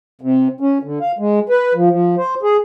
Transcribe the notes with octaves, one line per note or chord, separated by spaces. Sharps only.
C3
C#4
D3
F5
G#3
B4
F3
F3
C5
G#4